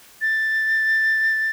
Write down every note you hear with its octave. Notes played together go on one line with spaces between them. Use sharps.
A6